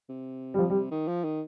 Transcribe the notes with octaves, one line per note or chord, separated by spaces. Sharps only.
C3
G3
F3
G3
D#3
F3
D#3